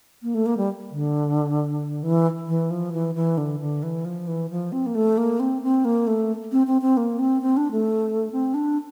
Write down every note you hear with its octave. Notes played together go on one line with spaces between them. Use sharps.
A#3
A3
A#3
G3
D3
E3
E3
F3
E3
E3
D3
D3
E3
F3
E3
F3
C4
A#3
A3
A#3
C4
C4
A#3
A3
C4
C4
C4
A#3
C4
C4
D4
A3
C4
D4